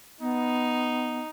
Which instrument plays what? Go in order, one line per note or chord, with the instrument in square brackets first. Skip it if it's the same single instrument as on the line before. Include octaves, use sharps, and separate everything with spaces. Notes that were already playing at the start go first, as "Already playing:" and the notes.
[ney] B3 [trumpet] D#4